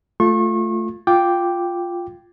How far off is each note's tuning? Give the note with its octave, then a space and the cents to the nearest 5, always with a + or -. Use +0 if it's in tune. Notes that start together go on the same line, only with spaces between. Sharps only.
A3 +0 F4 +0 C#6 -35
F4 +0 G5 +0 D6 +0